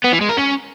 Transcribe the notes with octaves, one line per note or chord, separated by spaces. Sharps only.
B3
E3
G#3
A#4
C#4